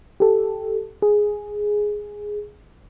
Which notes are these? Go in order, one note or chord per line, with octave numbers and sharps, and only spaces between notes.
G4 A4
G#4